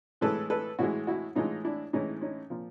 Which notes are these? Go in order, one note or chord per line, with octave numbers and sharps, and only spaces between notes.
A2 E3 G#3 A4 B4
A4 B4
A2 E3 G#3 E4 F#4
E4 F#4
A2 E3 G#3 D#4 F4
D4 E4
A2 E3 G#3 C#4 D#4
C#4 D#4
A#2 F3